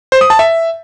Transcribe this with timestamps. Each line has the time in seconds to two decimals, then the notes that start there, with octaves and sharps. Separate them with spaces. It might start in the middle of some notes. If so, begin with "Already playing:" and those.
0.12 C5
0.21 D#6
0.30 A5
0.39 E5